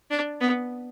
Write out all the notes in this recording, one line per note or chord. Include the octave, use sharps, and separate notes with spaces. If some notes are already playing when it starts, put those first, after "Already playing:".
D4
B3